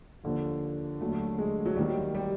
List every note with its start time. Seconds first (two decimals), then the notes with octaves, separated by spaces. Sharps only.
0.23 D#2 D3 F3
1.00 D#2 D3 F#3 A3
1.38 G#3
1.65 F#3
1.76 D#2 D#3 F#3 G3
2.14 G3